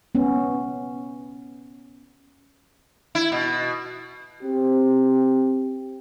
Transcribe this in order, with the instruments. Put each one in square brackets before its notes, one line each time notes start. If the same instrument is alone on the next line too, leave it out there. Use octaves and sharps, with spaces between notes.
[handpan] B3 C#4
[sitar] E4
B2
[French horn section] C4 G4